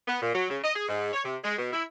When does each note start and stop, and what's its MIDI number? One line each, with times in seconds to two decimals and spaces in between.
0.08 0.20 59
0.22 0.32 46
0.35 0.47 54
0.50 0.58 49
0.64 0.71 75
0.75 0.85 68
0.88 1.12 44
1.13 1.24 73
1.24 1.36 48
1.43 1.54 56
1.58 1.70 47
1.73 1.83 64